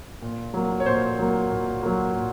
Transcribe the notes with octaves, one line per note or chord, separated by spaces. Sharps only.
A#2
F#3 A#3
C#5
A#2 C5
F#3 A#3
A#2
F#3 A#3
A#2